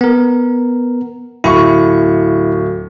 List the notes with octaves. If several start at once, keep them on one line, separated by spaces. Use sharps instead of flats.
B3 A#4
D1 E4 C#6